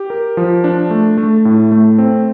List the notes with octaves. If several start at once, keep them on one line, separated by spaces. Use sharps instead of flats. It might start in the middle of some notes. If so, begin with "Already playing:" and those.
Already playing: G4
A#4
F3
D4
A3
A3
A2
A3
C4